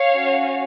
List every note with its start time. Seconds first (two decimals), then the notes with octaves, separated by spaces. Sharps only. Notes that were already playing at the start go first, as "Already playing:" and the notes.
Already playing: C#5 F5
0.12 C#4 F#4